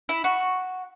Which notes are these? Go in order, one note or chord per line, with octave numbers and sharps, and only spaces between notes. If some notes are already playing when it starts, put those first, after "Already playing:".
E4
F#4